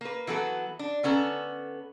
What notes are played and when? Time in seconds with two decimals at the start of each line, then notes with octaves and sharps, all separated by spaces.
0.01 A#3 B4
0.27 E3 F#3 B3 A4
0.79 D4
1.03 D3 B3 C#4 A4 A#5